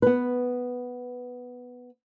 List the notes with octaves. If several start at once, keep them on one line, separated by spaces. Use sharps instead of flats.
B3 B4